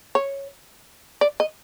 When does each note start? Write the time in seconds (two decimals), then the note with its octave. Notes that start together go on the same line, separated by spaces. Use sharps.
0.15 C#5
1.21 D5
1.40 D#5